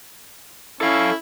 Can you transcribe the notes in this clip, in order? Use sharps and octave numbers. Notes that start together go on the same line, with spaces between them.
C#4 E4 A4 F5